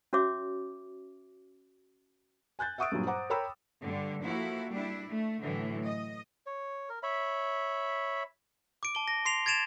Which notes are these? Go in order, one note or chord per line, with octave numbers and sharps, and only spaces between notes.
C#4 F#4 C#5 E5 D6
G#5 F#6 G6 A6
E5 F#5 C#6 D#6 E6 D7
G2 A#2 F#3
C5 F#5 A#5 D6
A#4 C#5 G5 A#5 B5 E6
G2 D3
F3 A#3 E4 F#4 A4
G3 D4 E4
A3
A2 D3 E3 F#3
D#5
C#5
A#4
C#5 E5 B5
D6 D7
A5 G7
A#6
C6 C7 F7
G#6 A6 D7 E7 F7